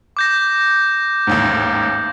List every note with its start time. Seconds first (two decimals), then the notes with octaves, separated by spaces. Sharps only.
0.17 D6 G6 A#6
1.27 A1 D#2 G#2